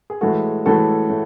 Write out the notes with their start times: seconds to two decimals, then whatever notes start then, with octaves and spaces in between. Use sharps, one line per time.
0.10 G#4
0.21 A2 E3 G#3 F#4 A4
0.65 A2 E3 G#3 F#4 A4
1.10 A2